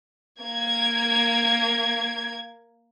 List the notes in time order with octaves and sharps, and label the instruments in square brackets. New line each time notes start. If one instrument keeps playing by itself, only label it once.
[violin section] A#3 G#6